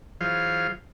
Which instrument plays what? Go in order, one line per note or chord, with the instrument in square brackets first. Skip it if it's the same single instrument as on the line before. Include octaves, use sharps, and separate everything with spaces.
[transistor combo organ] E3 F#3 F4 G#4 C5 F5